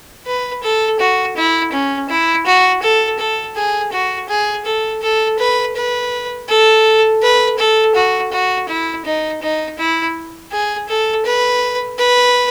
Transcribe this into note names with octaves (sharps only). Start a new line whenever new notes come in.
B4
A4
F#4
E4
C#4
E4
F#4
A4
A4
G#4
F#4
G#4
A4
A4
B4
B4
A4
B4
A4
F#4
F#4
E4
D#4
D#4
E4
G#4
A4
B4
B4